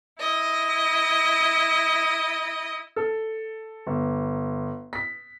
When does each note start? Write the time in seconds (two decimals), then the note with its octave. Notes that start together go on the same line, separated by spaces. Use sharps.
0.20 E4 D#5
2.96 A4
3.87 G1
4.93 B6